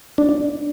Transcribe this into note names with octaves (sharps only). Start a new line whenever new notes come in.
D4